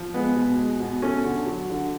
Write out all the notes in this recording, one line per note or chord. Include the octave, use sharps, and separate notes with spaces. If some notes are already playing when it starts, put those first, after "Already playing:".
Already playing: F3
G#3 B3
B2
G#3
B2
A3 C#4
D3
F#3
D3